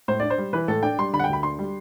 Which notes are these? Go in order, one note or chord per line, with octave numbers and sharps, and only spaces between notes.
A2 C5
D4 D5
C5
G3
E3 B4
A2 A4
D4 G5
G3 C6
D3 B5
F#5
G5
D2 B5
D4 C6
G3